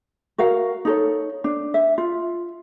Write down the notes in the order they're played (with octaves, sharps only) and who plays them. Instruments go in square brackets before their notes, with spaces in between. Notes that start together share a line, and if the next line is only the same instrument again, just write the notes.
[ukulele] F#4 A#4 F5 F#5
D#4 A4 C#5
D4
E5
F4